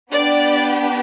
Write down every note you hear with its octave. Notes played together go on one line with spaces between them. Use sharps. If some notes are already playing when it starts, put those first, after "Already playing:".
B3 D4 G4 D5